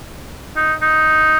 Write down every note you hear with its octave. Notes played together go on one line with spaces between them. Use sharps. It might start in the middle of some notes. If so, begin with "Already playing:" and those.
D#4
D#4